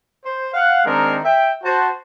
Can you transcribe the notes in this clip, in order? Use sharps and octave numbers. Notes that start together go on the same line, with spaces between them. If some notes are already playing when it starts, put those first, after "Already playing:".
C5
F5 F#5
D#3 G#3 C4 D4 D#4 A#4
E5 G5
F#4 C5 A5